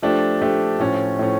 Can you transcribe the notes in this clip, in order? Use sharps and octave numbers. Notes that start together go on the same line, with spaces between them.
F3 A3 D4 G4
F3 A3 D4 G4
A2 F3 C#4
A2 F3 C#4